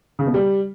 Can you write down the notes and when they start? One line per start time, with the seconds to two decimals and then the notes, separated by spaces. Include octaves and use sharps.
0.19 C#3
0.26 B2
0.34 G3